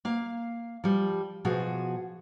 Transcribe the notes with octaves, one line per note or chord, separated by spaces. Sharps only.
A#3 F5
F3 G3
B2 F3 F#4 G#4